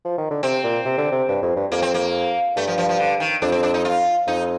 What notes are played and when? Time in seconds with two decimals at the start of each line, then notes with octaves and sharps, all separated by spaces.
0.05 F3
0.18 D#3
0.31 D3
0.43 C3 C4
0.64 A#2
0.85 C3
0.98 D3
1.12 C3
1.29 G2
1.42 F2
1.56 G2
1.72 F2 A#3
1.82 C4
1.94 A#3
2.56 G2 A3
2.67 F3
2.78 F3
2.89 F3
2.99 D3
3.20 D#3
3.42 F2 D4
3.52 C4
3.63 D4
3.74 D#4
3.85 F4
4.27 F2 D#4